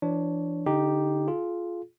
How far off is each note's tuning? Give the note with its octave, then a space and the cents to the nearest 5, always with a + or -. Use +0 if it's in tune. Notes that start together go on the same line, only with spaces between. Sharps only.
E3 +40 D4 +0 C#5 +0
D3 -20 D#4 +0 G4 +0
F4 +0 G#4 +30